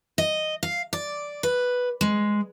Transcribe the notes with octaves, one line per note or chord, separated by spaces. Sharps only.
D#5
F5
D5
B4
G#3